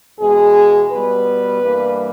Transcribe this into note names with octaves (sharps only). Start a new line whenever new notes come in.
E2 B2 G#3 G#4
B2 G3 B3 B4
G2 E3 G3 A#3